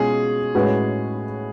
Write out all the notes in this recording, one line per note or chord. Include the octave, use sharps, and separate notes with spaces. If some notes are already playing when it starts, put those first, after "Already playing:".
Already playing: B2 G#3 C#4 F4 G#4
A2 G#3 C#4 F#4 B4